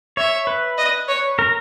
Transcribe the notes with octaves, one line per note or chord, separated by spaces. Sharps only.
C#5 E5
B4
D#5
C#5
A#4